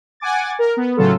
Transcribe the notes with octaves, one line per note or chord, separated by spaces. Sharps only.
F#5 G#5 D6 A6
A#4
B3
A2 C#3 F#3 F4 A4